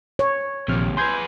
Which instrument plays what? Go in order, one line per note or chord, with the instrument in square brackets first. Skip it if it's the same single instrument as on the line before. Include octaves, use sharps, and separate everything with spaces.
[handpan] C#5
[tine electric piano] A#1 F6 [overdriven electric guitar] D#2 C3
[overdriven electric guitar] G#4 B4 [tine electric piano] C6 G6 G#6